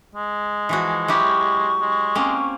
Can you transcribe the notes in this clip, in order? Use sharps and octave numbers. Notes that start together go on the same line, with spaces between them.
G#3
E3 F3 F#4
F#3 E4 G4 C#6
G#3
A#3 C4 C#4